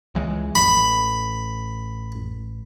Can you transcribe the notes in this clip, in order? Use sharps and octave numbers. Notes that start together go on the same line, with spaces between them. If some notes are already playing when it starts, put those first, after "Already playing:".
C#2 E3 G#3
A1 B5